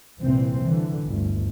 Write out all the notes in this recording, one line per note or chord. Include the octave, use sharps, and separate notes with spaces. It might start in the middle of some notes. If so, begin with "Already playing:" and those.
C2 A#2 E3 C4
D3 E3
G1 D2